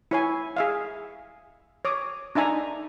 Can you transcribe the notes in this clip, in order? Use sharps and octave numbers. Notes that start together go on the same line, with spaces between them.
E4 C#5 G#5
G#4 E5 F5
C#5 D6 D#6
D4 D#4 E5 G#5 A#5